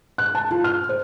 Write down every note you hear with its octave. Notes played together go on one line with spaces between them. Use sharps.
F#6
A5
F4
F6
C5